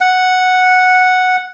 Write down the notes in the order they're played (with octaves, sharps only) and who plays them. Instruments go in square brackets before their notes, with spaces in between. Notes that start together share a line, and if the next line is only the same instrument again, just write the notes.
[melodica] F#5